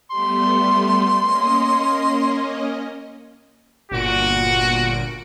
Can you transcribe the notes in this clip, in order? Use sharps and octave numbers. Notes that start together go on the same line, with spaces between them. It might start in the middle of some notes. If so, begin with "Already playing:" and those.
G3 A3 B3 C6
A#3 C#4 D#5
G1 A#2 F#4 D7